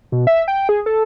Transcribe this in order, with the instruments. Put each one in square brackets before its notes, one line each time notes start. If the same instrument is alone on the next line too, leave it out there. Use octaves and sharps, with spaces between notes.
[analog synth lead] B2
E5
G5
G#4
A4